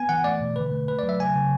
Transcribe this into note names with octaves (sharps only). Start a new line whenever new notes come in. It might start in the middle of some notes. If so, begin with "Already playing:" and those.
Already playing: B3 G#5
E3 F#5
A3 D5
B2
D3 B4
A3
A3 B4
D5
F#3
E5
C#3 G#5
C#3